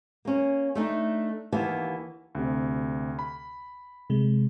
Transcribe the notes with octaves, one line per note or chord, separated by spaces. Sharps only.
A#3 C#4
A3 D4 D#4
D#2 E3 A#3 B3 F5 A5
D2 C3
B5
C3 G#3